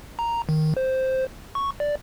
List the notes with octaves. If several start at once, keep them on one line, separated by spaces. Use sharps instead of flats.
A#5
D#3
C5
C#6
D5